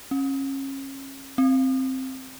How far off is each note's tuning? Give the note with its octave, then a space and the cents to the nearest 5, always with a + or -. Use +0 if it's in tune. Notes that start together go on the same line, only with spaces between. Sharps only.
C#4 -30
C4 +5